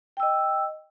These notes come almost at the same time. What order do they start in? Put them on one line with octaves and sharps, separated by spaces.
G5 E6 D#5